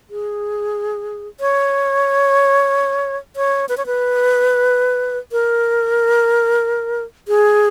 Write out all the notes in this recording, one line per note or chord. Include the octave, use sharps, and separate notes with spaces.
G#4
C#5
C#5
B4
C#5
B4
A#4
G#4